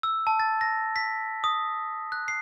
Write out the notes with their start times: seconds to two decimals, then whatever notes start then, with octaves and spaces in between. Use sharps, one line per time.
0.03 E6
0.27 A5
0.40 A6
0.61 A#6
0.96 B6
1.44 D#6
2.12 F#6
2.28 C7